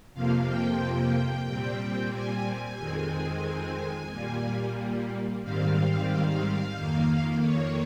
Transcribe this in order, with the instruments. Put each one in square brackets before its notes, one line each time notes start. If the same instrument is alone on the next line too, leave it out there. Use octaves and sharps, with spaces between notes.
[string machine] F2 C3 F3 A#3 F5
G5
A#2 G3 C4
G#5
F2 D#3 G#3 C4
A#2 G3 A#3
G#2 D#3 G3 C4 F5
F2 D#3 A#3
C#5